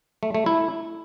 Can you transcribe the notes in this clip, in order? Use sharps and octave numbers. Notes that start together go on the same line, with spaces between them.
A3
A3
E4